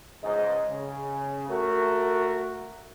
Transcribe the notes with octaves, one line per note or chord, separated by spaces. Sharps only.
C#2 G#2 D#5
C#3
A3 F#4 A#4